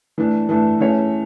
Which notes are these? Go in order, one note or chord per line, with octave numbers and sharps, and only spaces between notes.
E3 A3 D4
E3 A3 D4
E3 A3 C#4 G#4 C#5